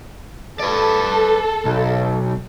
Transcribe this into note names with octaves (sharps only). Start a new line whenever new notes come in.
A4 B4 D5
B1